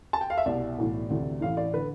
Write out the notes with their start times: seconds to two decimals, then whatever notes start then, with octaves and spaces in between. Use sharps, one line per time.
0.13 A5
0.21 G5
0.30 F5
0.37 E5
0.46 C2 B2 D5
0.78 B1 A2 E3
1.10 D2 C3 E3
1.41 A1 A2 E3 F5
1.57 D5
1.74 D3 B4